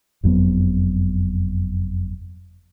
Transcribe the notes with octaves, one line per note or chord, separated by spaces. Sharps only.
F#1 F2 F#3 B3